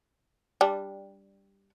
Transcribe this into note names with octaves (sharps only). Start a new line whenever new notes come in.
G3 D4